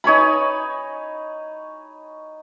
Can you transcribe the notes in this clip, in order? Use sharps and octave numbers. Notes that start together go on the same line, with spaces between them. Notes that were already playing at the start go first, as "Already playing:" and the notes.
D#4 C#5 G#5 B5